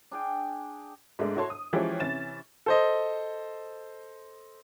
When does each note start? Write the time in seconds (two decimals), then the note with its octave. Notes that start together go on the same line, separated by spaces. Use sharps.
0.11 D4 G#4 G5
1.19 G#2 G#3 A3 D4
1.36 E4 F#4 A4 C#5 A5 C6
1.50 D#6
1.73 E3 F3 G#3 C#4 G4 C#5
2.00 C3 E3 C#4 A6 E7
2.66 A4 C5 D#5